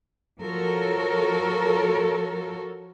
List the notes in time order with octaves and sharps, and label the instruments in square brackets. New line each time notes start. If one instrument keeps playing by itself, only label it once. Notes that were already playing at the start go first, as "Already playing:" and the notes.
[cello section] F3 F#4 A4 A#4 C#5